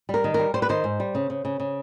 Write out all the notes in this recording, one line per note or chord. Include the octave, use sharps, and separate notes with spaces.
G3 A#4
D#3
G3 A#4
G3 C5
B4
D#3 C5
G#2
G3
C#3
C#3
C#3
C#3